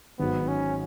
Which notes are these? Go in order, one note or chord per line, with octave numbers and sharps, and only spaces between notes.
G#1 G#2 F#3 B3
C#4